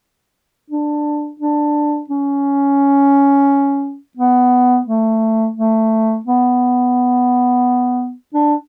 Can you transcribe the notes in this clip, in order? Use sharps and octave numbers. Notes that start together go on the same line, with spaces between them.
D4
D4
C#4
B3
A3
A3
B3
D4